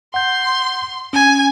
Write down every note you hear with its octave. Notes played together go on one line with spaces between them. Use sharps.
F#5 C6 G6
C#4 G#5